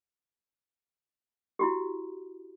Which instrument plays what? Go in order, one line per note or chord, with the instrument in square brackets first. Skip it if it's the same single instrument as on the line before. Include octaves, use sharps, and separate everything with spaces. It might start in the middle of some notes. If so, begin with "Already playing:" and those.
[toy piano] E4 F#4 G4